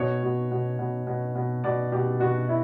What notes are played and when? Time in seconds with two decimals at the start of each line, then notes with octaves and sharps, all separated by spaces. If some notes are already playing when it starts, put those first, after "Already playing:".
Already playing: B2 C#5
0.23 B2
0.52 B2
0.79 B2
1.07 B2
1.35 B2
1.64 B2 D5
1.92 B2 G4
2.20 B2 F#4
2.49 E4